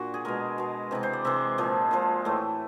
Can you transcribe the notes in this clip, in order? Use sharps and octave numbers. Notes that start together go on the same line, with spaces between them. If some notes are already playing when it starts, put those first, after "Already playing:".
Already playing: A#2 D4 F#4
G#4
B2 G#3 A#4
B2 G#3
C3 E3 G#3 B4
C5
D5
C3 E3 G#3 E5
A#2 F3 G#3
A#2 F3 G#3
A2 E3 A3